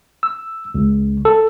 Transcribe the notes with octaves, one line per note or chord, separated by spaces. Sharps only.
E6
C#2
A4